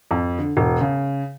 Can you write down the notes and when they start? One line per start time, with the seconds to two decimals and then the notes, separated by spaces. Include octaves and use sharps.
0.11 F2
0.39 D3
0.57 E1
0.81 C#3